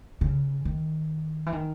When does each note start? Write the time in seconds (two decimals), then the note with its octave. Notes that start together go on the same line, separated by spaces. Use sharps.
0.21 C#3
0.65 D#3
1.46 E3
1.52 D#3